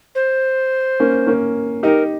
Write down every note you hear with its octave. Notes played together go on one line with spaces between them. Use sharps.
C5
A#3 C#4
A#3 C#4
D#4 G4 A#4